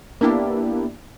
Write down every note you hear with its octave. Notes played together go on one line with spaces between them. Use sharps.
A#3 B3 D4 E4 G4